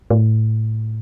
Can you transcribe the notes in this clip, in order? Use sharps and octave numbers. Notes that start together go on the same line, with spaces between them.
A2